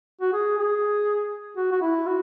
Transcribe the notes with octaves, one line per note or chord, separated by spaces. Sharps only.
F#4
G#4
G#4
F#4
F#4
E4
F#4